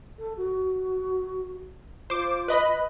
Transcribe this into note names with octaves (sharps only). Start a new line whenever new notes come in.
A4
F#4
F4 C5 D6
B4 D#5 B5